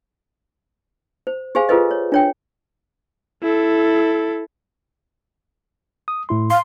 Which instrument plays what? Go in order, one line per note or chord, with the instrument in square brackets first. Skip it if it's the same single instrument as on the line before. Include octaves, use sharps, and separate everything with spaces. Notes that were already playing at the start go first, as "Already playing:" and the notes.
[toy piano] C5
G4 G#4 C5 F5 G#5
F4 G#4 A4 B4 C5 D#5
C#5
D4 C#5 G5
[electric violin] E4 A4
[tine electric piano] D#6
A2 E4 C6
[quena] F5 [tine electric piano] C6